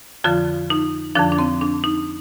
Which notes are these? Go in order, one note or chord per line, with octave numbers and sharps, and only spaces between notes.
F2 D3 F3 F4
D#4
F2 D3 F3 D4
D4
C4
D4
D#4